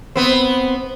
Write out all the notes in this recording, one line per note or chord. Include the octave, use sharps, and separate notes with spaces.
B3 C4